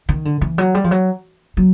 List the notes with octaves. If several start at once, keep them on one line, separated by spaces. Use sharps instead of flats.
D#3
D3
E3
F#3
G3
F3
F#3
F#3